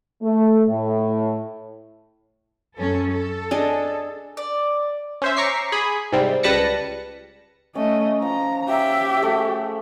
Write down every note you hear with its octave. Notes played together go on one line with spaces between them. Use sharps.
A3
A2
F#2 C#4 A4
A4
D4 G#4 D#5
D5
C#4 C5 E5
A#5 C#6 D6 B6 C7
G#4 B5
G#2 C3 G3 C4
C#2 G3 B4 A5 A#6 C#7
A3 C#4 D#5
F3 A#5
G4 E5
A3 G#4